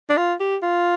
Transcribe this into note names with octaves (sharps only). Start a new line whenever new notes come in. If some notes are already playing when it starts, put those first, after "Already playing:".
D4
F4
G4
F4